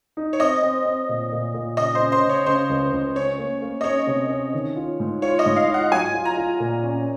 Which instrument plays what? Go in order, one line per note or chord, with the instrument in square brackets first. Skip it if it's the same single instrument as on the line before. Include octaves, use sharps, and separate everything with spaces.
[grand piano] D#4
[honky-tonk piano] C#5
[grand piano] C4 [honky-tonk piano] D#5
[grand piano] C4
C4
A#2
A#2
A#2
[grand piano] C#3 [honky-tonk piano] D#5
[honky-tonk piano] C5
[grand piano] C#4
[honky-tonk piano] C5
[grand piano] C#3
[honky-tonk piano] C#5
[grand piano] C#3 [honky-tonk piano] C5
[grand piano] C#2
C#2
[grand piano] C#4 [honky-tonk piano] C#5
[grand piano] A#3
A#3
[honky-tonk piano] D#5
[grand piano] C#4 [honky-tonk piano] C#5
[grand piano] C3
C#4
D#3
F4
G#2
[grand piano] F4 [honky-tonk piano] C#5
[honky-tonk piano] D#5
[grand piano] G#2
[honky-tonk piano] F5
[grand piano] F4
[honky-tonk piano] F#5
[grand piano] F#3 [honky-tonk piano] G#5
[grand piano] F4
[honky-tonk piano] A#5
[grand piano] F4
A#2
C#4